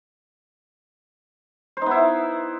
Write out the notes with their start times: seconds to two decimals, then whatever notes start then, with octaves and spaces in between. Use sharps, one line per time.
1.77 C5
1.82 D#4
1.86 B3
1.91 E4